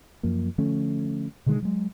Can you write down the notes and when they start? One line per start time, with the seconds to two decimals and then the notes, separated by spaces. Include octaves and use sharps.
0.23 F#2 F3 A#3
0.58 D3 F3 A3 C#4
1.46 B2 D3 D#3 G#3
1.62 F#3 G#3